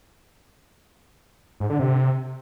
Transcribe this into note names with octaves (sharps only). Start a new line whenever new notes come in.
G#2
D3
C3